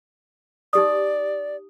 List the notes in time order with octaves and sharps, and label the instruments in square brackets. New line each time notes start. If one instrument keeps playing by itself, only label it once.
[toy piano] D#4 G4 D#6 [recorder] D5